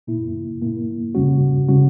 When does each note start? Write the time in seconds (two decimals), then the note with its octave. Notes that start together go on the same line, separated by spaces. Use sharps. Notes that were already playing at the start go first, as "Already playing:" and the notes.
0.07 A#2 A#3 E4
0.61 A#2 A#3 E4
1.15 E2 C#3 G3 C#4 F#4
1.68 C#3 G3 C#4 F#4